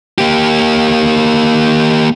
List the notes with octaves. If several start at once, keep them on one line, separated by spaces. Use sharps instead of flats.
A#3 G4